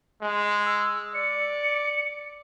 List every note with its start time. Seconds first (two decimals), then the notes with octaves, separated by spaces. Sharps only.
0.22 G#3
0.66 E6
1.14 D5 C#7